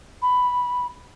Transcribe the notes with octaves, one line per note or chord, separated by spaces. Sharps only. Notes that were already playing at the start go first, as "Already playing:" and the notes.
B5